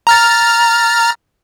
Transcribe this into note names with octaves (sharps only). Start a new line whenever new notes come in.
A#5 F6 A6